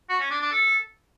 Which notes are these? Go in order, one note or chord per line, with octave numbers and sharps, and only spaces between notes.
F#4
C#4
D4
D4
A4